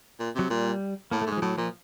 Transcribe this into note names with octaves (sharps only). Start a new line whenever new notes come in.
A#2
C3 F#3
A#2 G3
A2 A#3
A3
G#2
G#3
F3
A2 F#3
A#2 F3